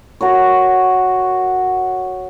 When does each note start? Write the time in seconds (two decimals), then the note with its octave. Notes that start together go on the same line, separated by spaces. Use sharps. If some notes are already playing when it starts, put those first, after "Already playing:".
0.21 F#4 A#4 C#5